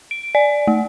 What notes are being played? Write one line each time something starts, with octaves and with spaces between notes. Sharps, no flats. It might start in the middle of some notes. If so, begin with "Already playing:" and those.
D7
D5
A3